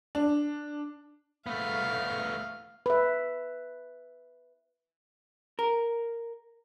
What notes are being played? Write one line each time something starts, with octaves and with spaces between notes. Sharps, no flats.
D4
A3 B3 F5
B4 E5
A#4